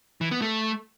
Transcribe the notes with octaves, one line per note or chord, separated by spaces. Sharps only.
E3
B3
A3